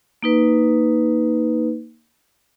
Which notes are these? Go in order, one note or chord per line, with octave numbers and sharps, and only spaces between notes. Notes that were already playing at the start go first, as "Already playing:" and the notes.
A#3 D#4 B4